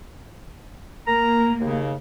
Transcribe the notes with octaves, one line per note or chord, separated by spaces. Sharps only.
A#3 A#4 A#5
D#2 C#3